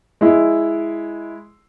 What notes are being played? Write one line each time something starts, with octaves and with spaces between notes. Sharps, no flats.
G#3 E4